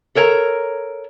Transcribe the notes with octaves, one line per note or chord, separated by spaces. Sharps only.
A4 A#4 C#5 G5 A#5